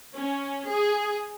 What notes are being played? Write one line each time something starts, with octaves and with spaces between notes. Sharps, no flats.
C#4
G#4